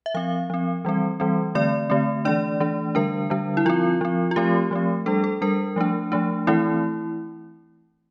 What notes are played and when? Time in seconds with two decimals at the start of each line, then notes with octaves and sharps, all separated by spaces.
0.06 E5
0.14 F3 C4 F5
0.50 F3 C4
0.85 E3 G3 C4
1.20 E3 G3 C4
1.55 D3 A3 C4 D5
1.90 D3 A3 C4
2.25 E3 A3 D4 D5
2.60 E3 A3 D4
2.95 D3 G3 D4 A#4
3.30 D3 G3 D4
3.57 E4
3.65 F3 C4 F4
4.01 F3 C4
4.31 F4
4.36 F3 A3 C4 G4
4.71 F3 A3 C4
5.06 G3 D4 A4
5.24 A4
5.42 G3 D4 A#4
5.76 F3 A3 D4
6.12 F3 A3 D4
6.47 E3 A3 C4 E4